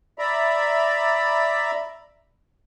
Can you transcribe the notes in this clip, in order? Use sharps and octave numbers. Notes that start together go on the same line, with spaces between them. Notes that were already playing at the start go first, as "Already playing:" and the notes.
D5 E5 A#5 B5